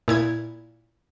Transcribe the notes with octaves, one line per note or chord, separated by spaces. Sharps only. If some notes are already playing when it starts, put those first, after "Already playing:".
A#2 E4 G#6